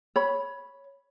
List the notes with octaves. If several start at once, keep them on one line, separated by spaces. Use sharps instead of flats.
C#5 B5